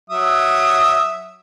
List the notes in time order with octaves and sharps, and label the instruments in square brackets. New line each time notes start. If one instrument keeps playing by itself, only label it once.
[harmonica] F#3 E5 D#6